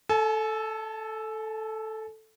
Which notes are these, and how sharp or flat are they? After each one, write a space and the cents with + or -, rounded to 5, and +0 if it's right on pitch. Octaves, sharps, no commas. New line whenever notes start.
A4 +0 G#5 +45